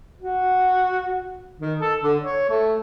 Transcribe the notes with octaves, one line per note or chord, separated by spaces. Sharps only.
F#4
D#3
A4
D3
C#5
A3